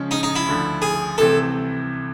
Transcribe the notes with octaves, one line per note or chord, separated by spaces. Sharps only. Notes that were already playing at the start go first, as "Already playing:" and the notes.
Already playing: C#3 F3 G#3 C#4
D#4
D#4
E4
D2 D3 F3
G#4
C2 C3 E3 A3 C4 A4